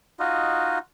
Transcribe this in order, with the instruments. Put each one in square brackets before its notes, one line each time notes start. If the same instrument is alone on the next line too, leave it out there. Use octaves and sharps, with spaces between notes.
[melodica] D#4 F4 F#4 D#5